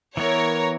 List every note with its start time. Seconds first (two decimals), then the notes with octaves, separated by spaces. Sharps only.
0.17 E3 B3 E4 A#4 C#5